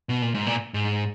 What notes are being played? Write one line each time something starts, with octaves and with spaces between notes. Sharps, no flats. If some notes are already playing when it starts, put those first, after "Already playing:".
B2
A#2
G#2
A#2
G#2